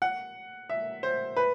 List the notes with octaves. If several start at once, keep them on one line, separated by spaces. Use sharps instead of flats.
F#5
E5
C5
B4